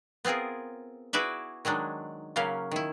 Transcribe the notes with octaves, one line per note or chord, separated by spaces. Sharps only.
B3 C4 F4 G#4 A#4
E4 F#4 G#4 B4 D5 E5
D#3 F#3 G#3 D4 D#4
C#3 F#3 A#3 C#4 F5
D#3 E4